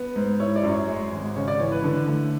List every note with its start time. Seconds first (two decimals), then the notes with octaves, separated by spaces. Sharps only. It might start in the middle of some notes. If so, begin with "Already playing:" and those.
Already playing: B3
0.16 G#2
0.40 E4 C#5
0.56 D5
0.64 F#2
0.72 C#5
0.88 G#3
1.12 G#1
1.36 C#3 C#5
1.48 D5
1.60 E3 C#5
1.72 B4
1.84 D3
2.08 A3